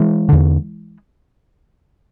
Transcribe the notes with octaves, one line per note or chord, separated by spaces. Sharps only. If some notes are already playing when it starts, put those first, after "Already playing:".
Already playing: E3 G#3
E2 D3